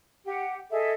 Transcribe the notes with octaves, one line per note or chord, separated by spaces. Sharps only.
G4 F#5
G#4 A4 D#5 E5